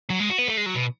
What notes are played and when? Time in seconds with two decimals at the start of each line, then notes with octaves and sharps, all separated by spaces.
0.10 F#3
0.20 G#3
0.30 F#4
0.38 B3
0.48 A3
0.57 G#3
0.66 F#3
0.76 B2